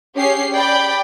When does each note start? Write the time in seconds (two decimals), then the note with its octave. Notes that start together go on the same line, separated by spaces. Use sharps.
0.17 C#4 G4 G#4 C7
0.55 D5 G5 B5